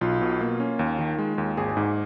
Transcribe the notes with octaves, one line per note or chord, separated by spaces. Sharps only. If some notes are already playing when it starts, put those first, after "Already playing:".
B1 F4
B2
A#3
C#4
D#2
D#3
G#3
D#2
G#1 G#4
G#2